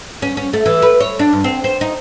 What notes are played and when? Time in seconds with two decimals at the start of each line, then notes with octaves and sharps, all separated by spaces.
0.22 C#4
0.37 C#4
0.53 A3
0.66 E3
0.82 B4
1.00 C#5
1.19 D4
1.33 G2
1.44 C4
1.64 C5
1.81 D#4